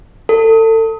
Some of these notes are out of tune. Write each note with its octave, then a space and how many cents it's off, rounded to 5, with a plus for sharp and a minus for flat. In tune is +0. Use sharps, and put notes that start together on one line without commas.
A4 +30